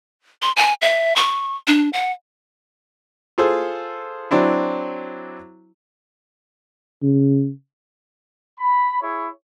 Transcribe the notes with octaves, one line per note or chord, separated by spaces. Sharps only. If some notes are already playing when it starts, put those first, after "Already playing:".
C6
G#5
E5
C#6
D4
F#5
F4 G#4 A4 C5
F#3 C4 D4 E4
C#3
B5
E4 G#4 C#5